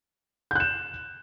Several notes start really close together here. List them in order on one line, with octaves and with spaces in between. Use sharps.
G6 F#6 E7